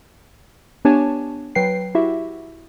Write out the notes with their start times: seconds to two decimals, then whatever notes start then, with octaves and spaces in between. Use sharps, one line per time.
0.85 B3 D4 G4 C#5 G#5 A5
1.55 F#3 B4 G5 C7
1.95 E4 F#4 G4 E5